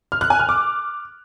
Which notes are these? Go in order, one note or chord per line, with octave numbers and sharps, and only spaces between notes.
F6
F#6
G#5
F6
D6